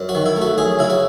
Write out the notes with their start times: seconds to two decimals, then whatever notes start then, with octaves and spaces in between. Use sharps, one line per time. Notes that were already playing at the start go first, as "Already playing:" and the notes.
Already playing: F#2
0.09 F#4
0.15 D#3
0.26 E4
0.36 A3
0.42 F#4
0.58 F#2 G#4
0.79 C#3 E4
0.90 F#4